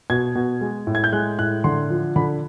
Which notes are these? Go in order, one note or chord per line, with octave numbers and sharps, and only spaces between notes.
B2 G#6
B2
G#3
A2
G#6
G6
G#3 F#6
A2 F#6
D3 C6
F3
D3 B5